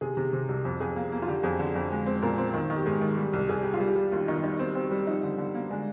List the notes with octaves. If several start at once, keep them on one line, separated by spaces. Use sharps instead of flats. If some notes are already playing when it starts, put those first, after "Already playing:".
C3 G#4
C3
C3
C2
F2
F2 G#4
A#3
A#3
F4
D3 G4
F2 G#4
D3
F2
G#3
C4
A#2 A#4
C4
D#3
D#3
G4
G#2 G#4
D#3
G3
C2
C2 G#4
G3 G4
F4
G3
G4
G3
D#2 F4
D#3 D#4
G3 D#4
C4
C4
G3
F3 D#4
D3
D3
A#3
G#3 D4